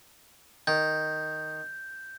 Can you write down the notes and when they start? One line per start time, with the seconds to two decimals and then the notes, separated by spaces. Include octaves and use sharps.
0.67 D#3 G6